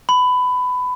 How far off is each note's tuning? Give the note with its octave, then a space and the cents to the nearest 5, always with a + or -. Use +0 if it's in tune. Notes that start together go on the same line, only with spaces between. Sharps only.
B5 +20